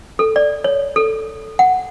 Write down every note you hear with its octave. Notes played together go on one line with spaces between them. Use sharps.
A4
D5
C#5
A4
F#5